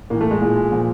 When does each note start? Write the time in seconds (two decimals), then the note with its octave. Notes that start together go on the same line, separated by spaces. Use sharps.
0.10 A2 E3 A#3
0.21 A3
0.31 G#3
0.41 A#2
0.72 A#2 F3